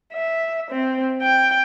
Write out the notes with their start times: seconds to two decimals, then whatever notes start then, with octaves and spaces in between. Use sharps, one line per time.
0.13 E5
0.71 C4
1.22 G5